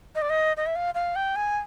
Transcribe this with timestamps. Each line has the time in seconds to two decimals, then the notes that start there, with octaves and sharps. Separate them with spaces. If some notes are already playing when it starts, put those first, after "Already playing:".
0.15 D#5
0.22 D5
0.30 D#5
0.57 D#5
0.66 E5
0.75 F5
0.94 F5
1.16 G5
1.36 G#5